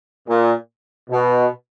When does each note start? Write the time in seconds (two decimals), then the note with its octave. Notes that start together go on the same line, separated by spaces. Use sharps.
0.29 A#2
1.10 B2